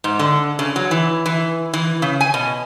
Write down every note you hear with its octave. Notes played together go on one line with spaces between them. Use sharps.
G#2
D3
C#3
F#3
E3
E3
E3
C#3
G#5
B2